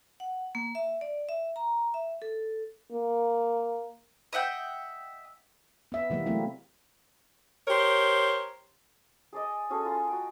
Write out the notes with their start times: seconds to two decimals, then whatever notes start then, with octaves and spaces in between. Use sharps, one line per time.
0.20 F#5
0.55 A#3
0.75 E5
1.01 D5
1.29 E5
1.56 A#5
1.94 E5
2.22 A4
2.92 A#3
4.33 D#5 E5 F#5 G5
5.92 B3 E5
6.10 C3 E3 G3 G#3 A#3
6.26 F#3 A3 A#3 C4 E4
7.68 G4 A#4 C5 C#5
9.33 G#4 D5 D#5
9.70 C#4 F#4 G#4 A4
9.84 F4 A#5 C6
10.08 F#4 G5